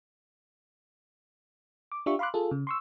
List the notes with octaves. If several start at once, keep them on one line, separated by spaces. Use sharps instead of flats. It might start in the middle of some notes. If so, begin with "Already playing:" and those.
D6
D4 F4 G4 E5 C#6
F5 B5 C6 D6 F#6
F4 G#4 A4
C#3
C6 C#6 E6